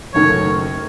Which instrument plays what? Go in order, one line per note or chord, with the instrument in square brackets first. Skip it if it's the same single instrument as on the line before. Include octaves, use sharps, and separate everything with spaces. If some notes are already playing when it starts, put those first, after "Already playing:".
[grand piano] F#1 F#2 D#3 A3 [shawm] C#5